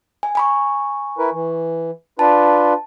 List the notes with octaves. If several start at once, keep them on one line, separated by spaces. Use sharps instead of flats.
G#5
G#5 B5 C#6
E4 A#4 B4
E3
D4 F4 B4 A5